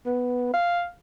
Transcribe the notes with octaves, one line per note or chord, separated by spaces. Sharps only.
B3
F5